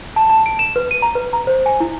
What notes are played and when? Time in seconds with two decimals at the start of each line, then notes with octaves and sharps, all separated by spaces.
0.16 A5
0.30 A5
0.46 D7
0.59 E7
0.76 B4
0.91 D#7
1.02 A#5
1.15 B4
1.33 A#5
1.47 C5
1.66 G#5
1.80 E4